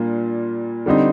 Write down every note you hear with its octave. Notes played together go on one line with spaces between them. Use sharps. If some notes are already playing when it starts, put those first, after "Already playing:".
Already playing: A#2 G3 A#3 D4 F4
D3 G3 C4 D#4